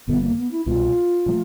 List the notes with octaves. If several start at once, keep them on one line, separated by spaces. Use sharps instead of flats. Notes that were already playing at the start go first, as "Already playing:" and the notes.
G1 F2 D3 G3 B3
A#3
B3
E4
C2 B2 G#3 F4
A2 F3 A3